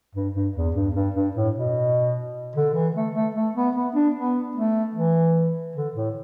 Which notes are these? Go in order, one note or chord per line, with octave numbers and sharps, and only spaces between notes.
G2
G2
E2
G2
G2
G2
A2
B2
D3
E3
A3
A3
A3
B3
B3
D4
B3
A3
E3
D3
A2